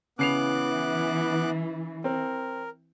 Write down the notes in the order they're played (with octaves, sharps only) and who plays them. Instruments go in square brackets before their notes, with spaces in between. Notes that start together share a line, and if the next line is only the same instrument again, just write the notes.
[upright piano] C#3 C7 F7 [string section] E3 [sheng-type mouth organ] B3 D6 F#6
[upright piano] C4 [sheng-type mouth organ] A#4